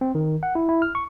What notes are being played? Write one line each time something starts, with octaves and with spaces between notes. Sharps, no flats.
C4
D#3
F#5
E4
E4
F6
C#6